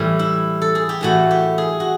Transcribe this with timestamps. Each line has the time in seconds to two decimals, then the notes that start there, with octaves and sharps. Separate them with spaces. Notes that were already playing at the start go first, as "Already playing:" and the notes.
Already playing: A2 E3 G3
0.19 E4
0.62 A4
0.75 G#4
0.89 G4
1.01 A2 E3 A3 F#4
1.31 G4
1.58 G#4
1.80 F#4